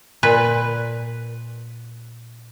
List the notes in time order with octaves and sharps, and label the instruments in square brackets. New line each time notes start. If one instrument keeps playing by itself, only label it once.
[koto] A#2 B4